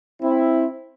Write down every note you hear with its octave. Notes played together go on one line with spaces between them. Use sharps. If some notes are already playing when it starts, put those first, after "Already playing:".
C4 E4